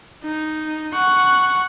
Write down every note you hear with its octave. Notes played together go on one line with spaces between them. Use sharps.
D#4
F#5 C#6